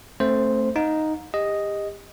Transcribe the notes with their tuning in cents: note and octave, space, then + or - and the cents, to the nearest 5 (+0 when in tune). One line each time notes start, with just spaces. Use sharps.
A3 +10 C4 +35 C5 +0
D#4 +0 F5 +45
G4 +35 D#5 +0